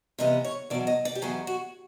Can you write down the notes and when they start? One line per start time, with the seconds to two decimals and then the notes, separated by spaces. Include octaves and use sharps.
0.19 C3 E3 G3 B3 D#5
0.45 C#5
0.70 E2 B2 F#3 D5
0.87 D#5
1.05 D5
1.15 G4
1.22 E2 B2 F#3 G#4
1.47 F#4